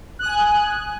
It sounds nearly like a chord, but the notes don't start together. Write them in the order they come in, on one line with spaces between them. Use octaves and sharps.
F#6 D#6 G#5